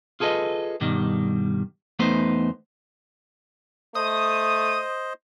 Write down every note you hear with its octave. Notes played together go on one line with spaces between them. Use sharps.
F4 G#4 A4 B4 D#5
G2 B2 D#3 G3
E2 A3 B3 D#4 B4 C5
A3 C5 D#5 D#6